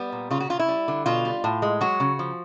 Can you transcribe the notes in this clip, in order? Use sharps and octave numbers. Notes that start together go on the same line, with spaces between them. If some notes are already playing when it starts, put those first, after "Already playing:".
Already playing: G3 B3
A#2
C#3 F4
F#4
C#3 F4
E4
G3
D3
B2 F4
G3
A2
G#3
F#3 F#4
C#3
F3